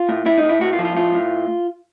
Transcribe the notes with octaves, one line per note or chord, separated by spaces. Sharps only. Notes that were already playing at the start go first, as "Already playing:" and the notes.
Already playing: F4
A2
A2 E4
D#4
A2
E4
A2 F#4
F4
F3
F4
A2 F4
A2